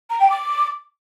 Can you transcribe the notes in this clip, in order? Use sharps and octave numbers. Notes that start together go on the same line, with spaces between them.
A#5
G5
D6